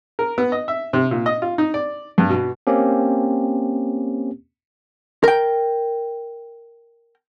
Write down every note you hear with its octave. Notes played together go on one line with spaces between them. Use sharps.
A#4
B3
D#5
E5
C3
A#2
D#5
F4
D#4
D5
G2
B2
A#3 C4 C#4 G4
A#4 G5